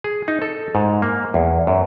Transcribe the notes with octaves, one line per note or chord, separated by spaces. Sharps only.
G#4
D#4
A4
G#2
A#3
E2
F#2